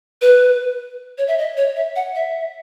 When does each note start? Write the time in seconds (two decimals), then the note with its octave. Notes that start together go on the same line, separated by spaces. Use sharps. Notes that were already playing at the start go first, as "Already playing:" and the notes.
0.22 B4
1.18 C#5
1.28 E5
1.38 D#5
1.57 C#5
1.76 E5
1.96 F#5
2.15 E5